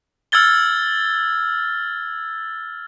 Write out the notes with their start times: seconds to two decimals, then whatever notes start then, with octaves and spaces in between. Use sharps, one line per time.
0.32 E6 F6 G#6 A6 G7